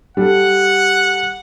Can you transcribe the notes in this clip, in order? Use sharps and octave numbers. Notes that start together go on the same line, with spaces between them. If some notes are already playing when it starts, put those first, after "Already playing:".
G3 A4 F#5